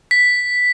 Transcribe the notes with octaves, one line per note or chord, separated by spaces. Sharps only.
B6